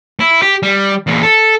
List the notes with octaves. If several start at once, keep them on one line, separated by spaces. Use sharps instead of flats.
E4
G4
G3
E2 A#2
A4